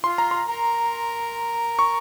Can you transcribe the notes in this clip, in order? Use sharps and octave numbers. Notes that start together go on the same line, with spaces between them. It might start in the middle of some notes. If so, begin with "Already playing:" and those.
F4 C6
A#5
C6
A#4
C#6